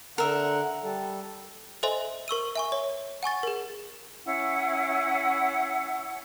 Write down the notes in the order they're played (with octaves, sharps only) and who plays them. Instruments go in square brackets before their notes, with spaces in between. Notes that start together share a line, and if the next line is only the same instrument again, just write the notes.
[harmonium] D3 F#5 [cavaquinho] A#4 E5
[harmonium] G3 A4
[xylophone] A4 C5 D#5 E5 G#5 C6
A#4 C#6 E6 D#7
E5 G#5 C#6
C#5
F#5 G#5 C#6 A6
G#4 A#4
[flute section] C#4 E4 F#5